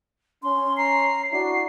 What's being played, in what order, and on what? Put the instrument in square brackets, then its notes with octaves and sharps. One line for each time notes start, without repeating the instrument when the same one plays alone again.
[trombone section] C#4 [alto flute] C6
[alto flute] A#5 [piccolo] C7
[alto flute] D4 [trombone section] E4 F#4 [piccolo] C7